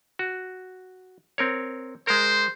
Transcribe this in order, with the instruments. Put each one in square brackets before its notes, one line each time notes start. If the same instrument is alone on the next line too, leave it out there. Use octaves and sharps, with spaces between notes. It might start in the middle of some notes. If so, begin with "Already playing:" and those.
[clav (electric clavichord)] F#4
C4 A#4 C#5
[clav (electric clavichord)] G#3 A#4 [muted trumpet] C5